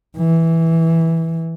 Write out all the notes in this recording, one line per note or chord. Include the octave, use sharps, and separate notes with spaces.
E3